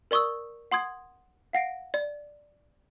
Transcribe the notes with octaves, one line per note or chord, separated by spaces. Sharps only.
A#4 D5 C#6 D#6 E6
F#5 C6 D#6 G#6
F5 F#5 A#6 D7
D5